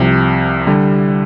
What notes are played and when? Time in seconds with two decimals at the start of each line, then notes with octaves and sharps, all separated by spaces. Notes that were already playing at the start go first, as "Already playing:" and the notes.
Already playing: C2 C3 F3
0.67 D3 G3